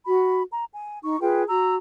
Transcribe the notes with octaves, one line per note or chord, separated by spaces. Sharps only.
F#4 B5
A#5
G#5
D#4 C#6
F4 G#4 B4 G5
F#4 A#5 E6